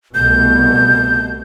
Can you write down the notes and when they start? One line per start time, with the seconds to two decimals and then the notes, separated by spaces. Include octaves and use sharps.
0.15 C2 B2 A3 G6